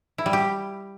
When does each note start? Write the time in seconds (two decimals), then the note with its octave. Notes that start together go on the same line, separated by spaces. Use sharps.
0.18 E4
0.26 G3
0.33 G4